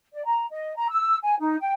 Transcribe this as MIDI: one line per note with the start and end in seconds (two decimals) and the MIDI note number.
0.13 0.23 74
0.25 0.44 82
0.50 0.74 75
0.76 0.88 82
0.90 1.16 88
1.22 1.35 80
1.39 1.56 63
1.61 1.73 79